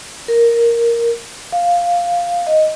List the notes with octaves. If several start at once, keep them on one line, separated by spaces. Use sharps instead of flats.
A#4
F5
D#5